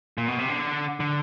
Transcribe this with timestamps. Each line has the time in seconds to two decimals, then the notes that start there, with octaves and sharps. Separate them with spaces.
0.18 A#2
0.28 B2
0.39 C3
0.49 D3
1.00 D3